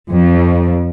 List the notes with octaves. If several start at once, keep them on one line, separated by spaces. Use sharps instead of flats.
F2